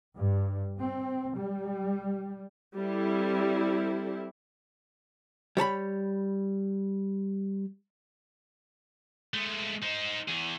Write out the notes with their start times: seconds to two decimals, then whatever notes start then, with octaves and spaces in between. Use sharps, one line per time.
0.17 G2
0.79 C4
1.37 G3
2.77 G3 C4 E4 A4
5.57 G3 C#5 A5 B5
9.34 G#3 A3
9.82 D#4 C5
10.28 E2 G#4